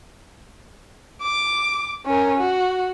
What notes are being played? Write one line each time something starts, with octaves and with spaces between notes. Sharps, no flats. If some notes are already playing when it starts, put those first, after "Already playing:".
D6
C#4 A#4
F#4